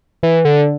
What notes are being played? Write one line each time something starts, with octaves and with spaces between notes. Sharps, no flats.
E3
D3